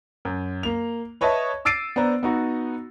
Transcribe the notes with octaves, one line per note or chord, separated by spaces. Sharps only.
F#2
A#3 F7
B4 C#5 D#5 E5 A5 C#6
D6 E6 A6 C7 D7 D#7
B3 D4 C5 A#5
B3 D#4 F#4